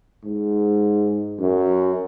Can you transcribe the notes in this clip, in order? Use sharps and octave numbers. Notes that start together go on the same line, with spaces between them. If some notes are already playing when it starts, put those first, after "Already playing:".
G#2
F#2